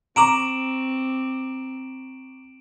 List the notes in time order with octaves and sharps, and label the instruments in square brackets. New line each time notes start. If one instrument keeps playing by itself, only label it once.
[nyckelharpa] C4 [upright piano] A#5 C#6 D6 [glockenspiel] D7 E7 F#7